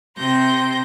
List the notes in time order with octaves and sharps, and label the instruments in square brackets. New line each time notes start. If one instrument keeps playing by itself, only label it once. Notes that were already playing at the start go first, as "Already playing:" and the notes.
[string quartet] C3 C6 G6 A#6